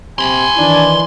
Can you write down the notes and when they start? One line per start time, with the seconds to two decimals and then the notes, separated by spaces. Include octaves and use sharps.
0.19 C3 G#5 B5 C6
0.58 D#3 E3 D4